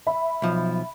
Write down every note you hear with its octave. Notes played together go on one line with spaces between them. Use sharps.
E5 B5
B1 F3